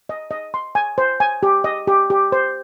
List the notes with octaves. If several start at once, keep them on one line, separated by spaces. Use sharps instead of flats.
D#5
D#5
C6
G#5
C5
G#5
G4
D#5
G4
G4
C5